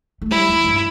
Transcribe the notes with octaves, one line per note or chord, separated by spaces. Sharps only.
A3
G3 E4
E2
G2